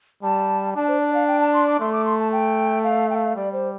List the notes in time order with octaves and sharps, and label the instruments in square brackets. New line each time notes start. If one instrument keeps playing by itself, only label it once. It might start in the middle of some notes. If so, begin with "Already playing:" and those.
[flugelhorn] G3 [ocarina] A5
[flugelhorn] D4 [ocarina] A5
[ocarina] C5
D5
F5
G5
A5
C6
D6
[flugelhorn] A3 [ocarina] C6
[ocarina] D6
C6
A5
G5
F5
G5
F5
[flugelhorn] G3 [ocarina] D5
[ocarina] C5